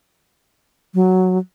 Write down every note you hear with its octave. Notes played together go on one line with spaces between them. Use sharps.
F#3